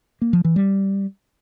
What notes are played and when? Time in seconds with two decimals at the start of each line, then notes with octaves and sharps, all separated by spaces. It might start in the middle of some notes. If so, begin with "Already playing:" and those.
0.22 A#3
0.33 F3
0.45 E3
0.56 G3